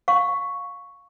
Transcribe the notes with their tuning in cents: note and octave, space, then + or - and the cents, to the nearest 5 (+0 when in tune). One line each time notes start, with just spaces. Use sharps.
F5 +15 C#6 +0